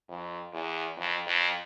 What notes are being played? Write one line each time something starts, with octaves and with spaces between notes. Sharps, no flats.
F2
E2
F2
F2